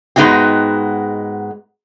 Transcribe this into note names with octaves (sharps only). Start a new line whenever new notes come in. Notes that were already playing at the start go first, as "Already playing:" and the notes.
G#2 G#3 B3 D#4 F#4 G5